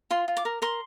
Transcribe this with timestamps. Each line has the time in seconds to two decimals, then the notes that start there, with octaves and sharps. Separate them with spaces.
0.10 F4 C6
0.28 F4
0.37 D6
0.45 A#4
0.62 A#4 C6